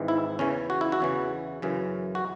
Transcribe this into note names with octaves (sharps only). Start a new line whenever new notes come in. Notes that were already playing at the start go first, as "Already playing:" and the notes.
Already playing: G#1 G#2 E3
E4
E2 C#3 E3 C#4
F#4
E4
F#4
E2 C#3 E3
F#2 C#3 E3
F#4